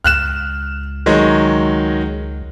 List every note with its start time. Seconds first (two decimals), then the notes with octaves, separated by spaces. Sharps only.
0.04 C#2 F6 F#6 E7
1.06 D#3 F#3 G#3